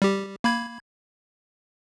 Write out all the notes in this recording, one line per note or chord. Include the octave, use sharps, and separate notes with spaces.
G3 G4
A#3 B5 G#6